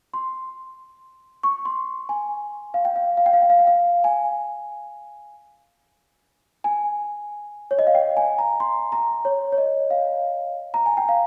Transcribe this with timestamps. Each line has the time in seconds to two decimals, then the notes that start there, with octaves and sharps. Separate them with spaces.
0.14 C6
1.43 C#6
1.65 C6
2.09 G#5
2.74 F5
2.85 G5
2.96 F5
3.17 F5
3.26 G5
3.33 F5
3.42 G5
3.50 F5
3.59 G5
3.67 F5
4.04 G#5
6.64 G#5
7.71 C#5
7.79 D#5
7.87 F5
7.95 G5
8.17 G#5
8.38 A#5
8.60 C6
8.92 A#5
9.25 C#5
9.52 C#5
9.58 D#5
9.90 F5
10.74 A#5
10.86 G#5
10.97 G5
11.09 F5